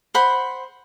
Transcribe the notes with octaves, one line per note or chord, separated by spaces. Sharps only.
C5 F#5 B5 C6